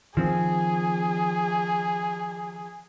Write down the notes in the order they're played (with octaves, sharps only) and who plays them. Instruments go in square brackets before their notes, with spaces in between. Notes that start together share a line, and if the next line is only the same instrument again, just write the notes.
[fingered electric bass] D#3 [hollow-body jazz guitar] F3 C4 [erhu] G#4